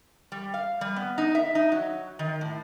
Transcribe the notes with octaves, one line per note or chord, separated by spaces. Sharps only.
G3
F5
G3
B3
D#4
E5
D#4
F#3
D#3
A2